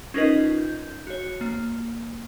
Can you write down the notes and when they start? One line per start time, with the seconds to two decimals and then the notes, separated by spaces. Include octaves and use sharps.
0.14 C#4 D#4 F4 A#4 B4 D#5
0.58 G6
1.07 F#4 C#5
1.41 A#3